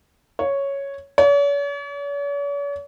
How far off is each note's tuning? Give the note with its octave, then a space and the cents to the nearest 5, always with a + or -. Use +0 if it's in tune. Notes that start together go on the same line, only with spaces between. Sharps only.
C#5 +0
C#5 +45